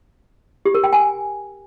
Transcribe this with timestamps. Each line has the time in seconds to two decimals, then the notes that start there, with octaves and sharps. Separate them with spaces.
0.66 G4
0.75 A#4
0.84 G5
0.93 G#5